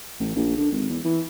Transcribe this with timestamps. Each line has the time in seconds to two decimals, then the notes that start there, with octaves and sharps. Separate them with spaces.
0.19 A1
0.36 A#1
0.57 D3
0.72 G#1
0.89 E2
1.04 E3